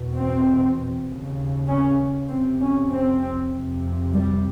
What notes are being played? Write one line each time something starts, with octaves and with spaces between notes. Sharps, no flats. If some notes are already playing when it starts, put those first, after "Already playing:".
Already playing: E2 B2
C4
D#2 C#3
C#4
F2 C3 C4
C#4
C4
F2 C3
G3